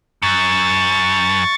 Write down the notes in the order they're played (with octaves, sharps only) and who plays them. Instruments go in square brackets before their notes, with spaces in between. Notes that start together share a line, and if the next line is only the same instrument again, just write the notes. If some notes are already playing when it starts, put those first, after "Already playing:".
[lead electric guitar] F#2 [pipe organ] C#6 A6